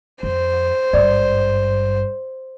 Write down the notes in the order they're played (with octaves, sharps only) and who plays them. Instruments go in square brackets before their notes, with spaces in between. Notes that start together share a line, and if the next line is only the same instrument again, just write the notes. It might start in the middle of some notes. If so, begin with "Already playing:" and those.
[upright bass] F2 [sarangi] C5
[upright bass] G#1 G2 [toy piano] D5